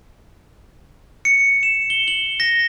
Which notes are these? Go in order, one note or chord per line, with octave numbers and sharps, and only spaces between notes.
C#7
E7
G7
F#7
A#6